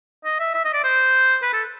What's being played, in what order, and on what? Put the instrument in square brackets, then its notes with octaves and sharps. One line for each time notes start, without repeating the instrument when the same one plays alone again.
[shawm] D#5
E5
E5
D#5
D5
C5
B4
A4